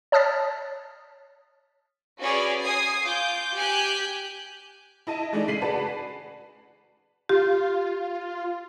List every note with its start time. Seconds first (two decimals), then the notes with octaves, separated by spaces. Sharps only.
0.12 C#5 A5 D#6 F6 A6 B6
2.20 C#4 F#4 G#4 B4 C#5 D5
2.61 G#5 D#6 G#6 C7
3.03 F4 D6 G6
3.55 G4 G#5 F#6 G6
5.07 E4 D#5 A5 D#7
5.32 E3 G#3 A3 D4 D#4
5.48 C#3 B6 C7 D#7 F#7
5.62 F#4 G#4 B4 D5 A5 B5
7.29 F4 G4